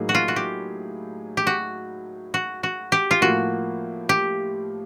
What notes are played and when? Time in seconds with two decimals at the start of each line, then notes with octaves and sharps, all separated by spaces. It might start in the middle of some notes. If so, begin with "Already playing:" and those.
Already playing: A2 F#3 A#3 D#4 G#4
0.09 F#4
0.15 F4
0.28 F#4
0.36 G4
1.37 G4
1.47 F#4
2.34 F#4
2.63 F#4
2.92 G4
3.11 F4
3.21 A2 F3 A#3 F#4
4.09 G4